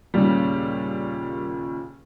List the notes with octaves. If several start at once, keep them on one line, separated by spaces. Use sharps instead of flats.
D#2 A#2 C#3 G3